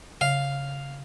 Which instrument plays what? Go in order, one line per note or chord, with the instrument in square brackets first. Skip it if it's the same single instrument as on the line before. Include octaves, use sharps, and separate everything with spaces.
[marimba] C#3 [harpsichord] F5